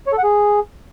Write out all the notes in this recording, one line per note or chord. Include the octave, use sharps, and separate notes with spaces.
C#5
A4
F#5
G#4